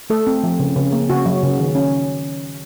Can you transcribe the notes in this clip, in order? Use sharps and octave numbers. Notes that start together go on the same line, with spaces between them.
A3 A4
C4
F3
C#3
C#3
A#3
C#3 F#4
F#3
C#3
D#3
C#4